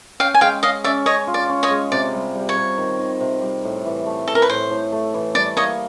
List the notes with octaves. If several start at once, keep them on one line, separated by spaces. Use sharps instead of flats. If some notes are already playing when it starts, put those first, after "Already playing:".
C#4 F5 G5
G#5
G#3 F5 G5
C#4 D#5 F5
C#4 D5 E5
C#4 C#5 D#5
F4
D5
C#4
C#5 D#5
G#3
C3 D5
G3
G3
C#5
C3
D#3
D#3
C3
G3
A2
E3
A3
E3 A4
A#4
B4
A2 C5
A2
A3
E3
G3 D5
A#3 C#5 D#5